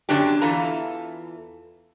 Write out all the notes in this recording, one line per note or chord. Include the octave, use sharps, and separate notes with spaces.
F#2 D3 F#3 B3 D4 G4
E2 E3 F4 A4 A#5